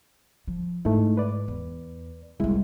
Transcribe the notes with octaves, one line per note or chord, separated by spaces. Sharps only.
F3
G#2 A3 D#4 E4
B4 D5
E2
C2 G#3 A#3 E4